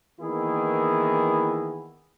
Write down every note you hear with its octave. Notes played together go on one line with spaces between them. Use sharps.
D#3 E3 A#3 B3 E4 G#4